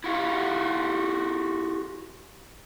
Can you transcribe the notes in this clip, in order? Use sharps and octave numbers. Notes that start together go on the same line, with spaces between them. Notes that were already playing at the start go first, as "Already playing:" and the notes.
E4 F#4 G4 F5